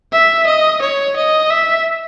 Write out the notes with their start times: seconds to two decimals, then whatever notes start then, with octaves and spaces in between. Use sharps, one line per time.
0.12 E5
0.46 D#5
0.82 C#5
1.16 D#5
1.50 E5